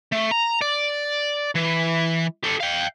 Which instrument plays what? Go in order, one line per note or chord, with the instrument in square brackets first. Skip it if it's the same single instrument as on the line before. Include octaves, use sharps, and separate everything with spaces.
[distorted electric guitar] A3
A#5
D5
E3
G4 A4
F5 G5